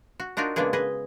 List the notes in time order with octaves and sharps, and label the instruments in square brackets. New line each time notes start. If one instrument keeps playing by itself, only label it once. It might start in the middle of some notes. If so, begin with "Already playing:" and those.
[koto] F#4
D4 D#4 F4 F#4 A#4
C#3 G#3 A#3 B3 D4 G#4
G#4 B4 D#5